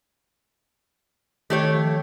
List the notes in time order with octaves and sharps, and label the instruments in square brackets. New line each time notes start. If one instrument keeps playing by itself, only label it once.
[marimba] D#3 [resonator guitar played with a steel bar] A3 G4 C#5
[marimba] F3